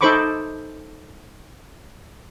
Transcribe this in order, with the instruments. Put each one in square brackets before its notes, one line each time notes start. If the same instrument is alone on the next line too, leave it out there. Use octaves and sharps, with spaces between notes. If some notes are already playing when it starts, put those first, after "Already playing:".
[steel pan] D#4 A4 C5 B5 C#6 D6